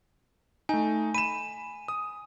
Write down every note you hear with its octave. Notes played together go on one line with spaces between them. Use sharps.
A3 D#4 G#5
B5 D#7 E7
D#6